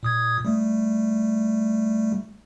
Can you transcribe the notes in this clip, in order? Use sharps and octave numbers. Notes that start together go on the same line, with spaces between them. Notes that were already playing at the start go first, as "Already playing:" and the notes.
A#2 D#6 G#6
G3 A3